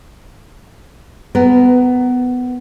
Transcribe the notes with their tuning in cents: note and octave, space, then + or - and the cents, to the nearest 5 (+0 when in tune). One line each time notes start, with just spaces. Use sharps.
B3 +15 A#4 +0